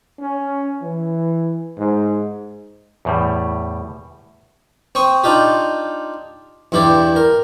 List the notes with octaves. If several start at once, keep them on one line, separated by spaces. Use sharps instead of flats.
C#4
E3
G#2
E2 A2 G3
C4 C#6 D#6
D4 D#4 F4 G4
E2 G2 E4 G4 D5
A#4